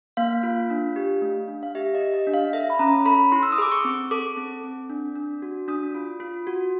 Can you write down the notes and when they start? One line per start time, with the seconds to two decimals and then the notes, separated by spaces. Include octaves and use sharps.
0.17 A#3 F5
0.43 F4
0.70 D4
0.96 G4
1.22 A3
1.48 D4
1.63 F5
1.75 G4 E5
1.95 D#5
2.01 G4
2.14 D#5
2.27 D4
2.34 F5
2.53 A4 E5
2.70 B5
2.79 C#4 A#5
3.05 A4 B5
3.32 E4 C6
3.43 E6
3.52 D#6
3.58 G#4 D6
3.72 C#6
3.85 C4
4.11 A4 D6
4.37 C4
4.64 C4
4.90 D4
5.15 D4
5.42 F#4
5.68 D4 D#6
5.95 F4
6.20 F4
6.47 F#4